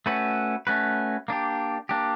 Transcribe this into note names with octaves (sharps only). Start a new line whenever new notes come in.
A3 C#4 F#4 B4
A3 C#4 F#4 B4
A#3 D4 G4
A#3 D4 G4